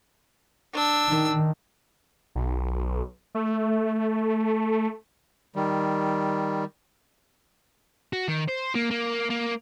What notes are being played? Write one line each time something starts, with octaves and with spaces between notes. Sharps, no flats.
D4 E6
D#3
B1
A3
D#3 G3
F#4
D#3
C5
A#3
A#3
A#3